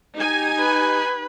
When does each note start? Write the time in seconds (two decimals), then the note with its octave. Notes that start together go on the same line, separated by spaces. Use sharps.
0.15 D#4 G4 G#5
0.59 B4